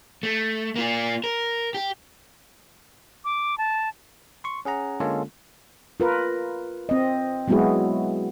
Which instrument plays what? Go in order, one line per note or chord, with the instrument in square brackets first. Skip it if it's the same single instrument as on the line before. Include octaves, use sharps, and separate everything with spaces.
[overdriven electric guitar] A3
A#3 F4
A#4
G4
[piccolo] D6
A5
[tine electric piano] C6 C#6
C#4 G#4 F#5 A#5
D3 G#3 A#3 C#4 F4 A4
[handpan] F4 A#4 B4
C4 D#5
F#3 G#3 B3 E4 F#4 G#4